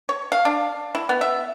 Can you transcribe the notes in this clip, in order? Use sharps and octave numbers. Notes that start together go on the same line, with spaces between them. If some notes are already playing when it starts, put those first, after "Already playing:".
C#5
F5
D4
E4
B3
E5